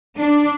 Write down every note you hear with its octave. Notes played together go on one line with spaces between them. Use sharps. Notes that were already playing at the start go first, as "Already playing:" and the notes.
D4